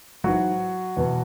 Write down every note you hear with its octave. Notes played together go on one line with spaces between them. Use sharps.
G#2 E3 F#3 F#4
E2 B2